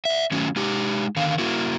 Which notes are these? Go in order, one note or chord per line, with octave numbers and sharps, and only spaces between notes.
D5 E5
D#3 F#3 A3 C#4
G#3 D#4 G4
D3 D#3 F5
A#3 E4 F#4 A#4